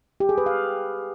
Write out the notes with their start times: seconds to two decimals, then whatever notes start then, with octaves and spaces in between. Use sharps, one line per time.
0.20 G4
0.29 G#4
0.38 B4
0.46 F5